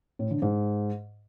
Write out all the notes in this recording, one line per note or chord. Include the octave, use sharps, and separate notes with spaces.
A2
D3
G#2